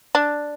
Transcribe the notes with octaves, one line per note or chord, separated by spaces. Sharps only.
D4